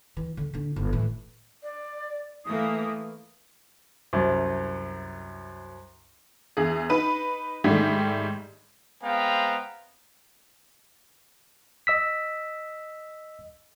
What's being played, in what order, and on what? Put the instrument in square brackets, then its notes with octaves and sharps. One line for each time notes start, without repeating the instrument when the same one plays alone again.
[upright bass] E3
D3
D3 D4
G1 G#2
A2 E3
[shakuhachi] D5
[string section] E3 A3 A#3 [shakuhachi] D#6
[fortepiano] C2 F#2
[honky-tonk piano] E2 G#4
D#4 B4
G#2 D#3 G3 A3
[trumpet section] G#3 B3 C4 F5 G5 A#5
[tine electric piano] D#5 E6 B6